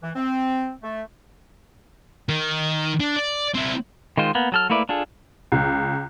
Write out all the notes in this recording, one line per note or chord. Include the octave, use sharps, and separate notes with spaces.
E3
C4
A3
D#3
D4
D5
C4 E4
D#3 G#3 F4 C5
A#3 B3
F#3 A4 F6
A3 A#3 E4 B4 D5
D4 F4 G#4 A4
C#2